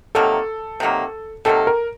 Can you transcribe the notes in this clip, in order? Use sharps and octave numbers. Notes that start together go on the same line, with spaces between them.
C3 D#3 F#3 A#3 A4
C3 D#3 F#3 A#3
C3 D#3 F#3 A#3 A4
A#4